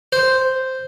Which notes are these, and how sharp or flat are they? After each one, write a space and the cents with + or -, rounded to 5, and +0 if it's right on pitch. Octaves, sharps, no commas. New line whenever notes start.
C5 -5